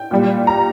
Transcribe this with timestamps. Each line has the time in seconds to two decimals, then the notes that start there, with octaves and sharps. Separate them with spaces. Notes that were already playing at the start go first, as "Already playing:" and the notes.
Already playing: G5
0.11 A#2 G3
0.47 A#5